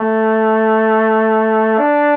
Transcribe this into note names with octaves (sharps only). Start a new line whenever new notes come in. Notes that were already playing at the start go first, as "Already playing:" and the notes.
Already playing: A3
D4